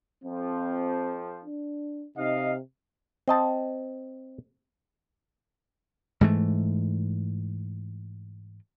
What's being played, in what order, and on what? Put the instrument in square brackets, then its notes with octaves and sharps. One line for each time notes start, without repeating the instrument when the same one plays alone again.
[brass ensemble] F2 F3 [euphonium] C4
[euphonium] D4
[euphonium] C3 [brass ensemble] D#4 D#5 F5
[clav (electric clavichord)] C4 D#5 A5
[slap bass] G#2 E3 A3